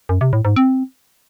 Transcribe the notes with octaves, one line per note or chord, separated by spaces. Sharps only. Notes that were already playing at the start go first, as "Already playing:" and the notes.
F#2
C3
A2
G#2
C4